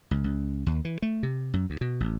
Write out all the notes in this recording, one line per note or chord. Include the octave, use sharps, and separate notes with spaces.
C#2
C#2
D#2
E3
A3
C3
F#2
D2
B2
A1